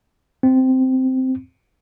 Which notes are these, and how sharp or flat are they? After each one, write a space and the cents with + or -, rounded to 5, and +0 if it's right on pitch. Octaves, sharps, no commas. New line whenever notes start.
C4 -10